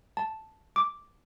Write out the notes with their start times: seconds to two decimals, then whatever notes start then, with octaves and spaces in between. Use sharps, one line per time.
0.17 A5
0.76 D6